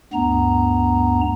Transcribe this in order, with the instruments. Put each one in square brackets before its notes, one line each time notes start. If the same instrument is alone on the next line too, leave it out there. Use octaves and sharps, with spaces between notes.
[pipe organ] D2 G2 B3 A#5